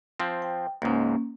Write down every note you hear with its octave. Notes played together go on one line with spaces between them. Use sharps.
F3 C4
G5
C#2 G#2 A#3 C#4